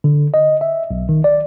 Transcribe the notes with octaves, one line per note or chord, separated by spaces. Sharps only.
D3
D#5
E5
B1
D#3
D5